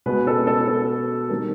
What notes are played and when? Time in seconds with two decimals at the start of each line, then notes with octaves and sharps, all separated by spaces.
0.06 B2 G#3 B3 B4
0.27 A4
0.47 A4
0.68 A4
1.29 D#3 G3 C4 A#4